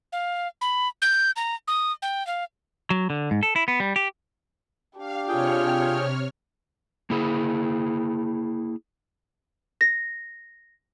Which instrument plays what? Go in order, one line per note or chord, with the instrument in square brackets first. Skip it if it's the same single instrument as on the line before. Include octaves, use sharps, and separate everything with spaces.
[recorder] F5
B5
G6
A#5
D#6
G5
F5
[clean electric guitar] F#3
D3
G#2
A4
E4
B3
G3
G4
[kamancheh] D4 G4 [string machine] F5
[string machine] C3 C#5 F6 [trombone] F4 [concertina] G#4 G5
[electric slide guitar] A#3 E4 G#4
[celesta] A#6